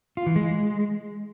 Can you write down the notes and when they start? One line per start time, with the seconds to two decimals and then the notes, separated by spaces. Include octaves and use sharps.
0.17 F4
0.26 E3
0.36 G#3